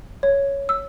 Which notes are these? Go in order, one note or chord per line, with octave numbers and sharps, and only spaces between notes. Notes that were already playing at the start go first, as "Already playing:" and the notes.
C#5
E6